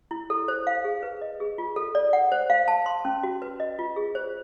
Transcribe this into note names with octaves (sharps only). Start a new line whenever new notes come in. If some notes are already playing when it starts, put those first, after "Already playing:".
E4
A4
C5
F5
G#4
B4
D#5
G#4
F4
A4
D5
F#5
C5
F5
A5
C6
C#4
F#4
B4
D#5
F4
G#4
C5